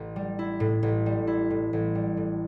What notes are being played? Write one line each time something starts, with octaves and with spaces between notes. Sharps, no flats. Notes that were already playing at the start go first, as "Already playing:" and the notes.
Already playing: A1
G3
E4
A2
A1
G3
E4
A2
A1
G3
A2